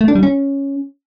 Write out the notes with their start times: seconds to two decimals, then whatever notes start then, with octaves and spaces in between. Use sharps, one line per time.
0.01 A3
0.08 D4
0.15 G3
0.23 C#4